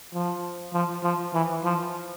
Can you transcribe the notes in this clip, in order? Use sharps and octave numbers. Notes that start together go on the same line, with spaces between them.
F3
F3
F3
E3
F3